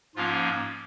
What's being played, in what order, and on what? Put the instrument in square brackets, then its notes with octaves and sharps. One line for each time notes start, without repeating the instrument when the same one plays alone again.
[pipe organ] G#2 F3 A#3 C#4 F4